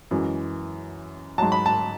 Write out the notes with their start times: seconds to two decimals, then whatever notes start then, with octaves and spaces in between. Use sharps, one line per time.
0.11 F#2 E3 G#3
1.38 G#2 F#3 A5
1.52 B5
1.66 A5